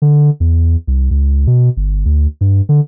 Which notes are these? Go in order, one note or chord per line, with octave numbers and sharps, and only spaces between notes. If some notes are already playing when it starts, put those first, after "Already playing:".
D3
E2
C2
C#2
B2
G1
D2
G2
D3